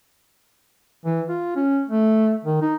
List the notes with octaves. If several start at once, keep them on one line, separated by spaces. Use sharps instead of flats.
E3
F4
C#4
A3
D#3
D#4